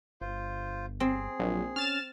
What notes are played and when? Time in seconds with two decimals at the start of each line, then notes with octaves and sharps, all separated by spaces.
0.21 G1 F4 C5
1.00 C4 G#4
1.40 A#1 F#3
1.76 C#4 F6 A6 E7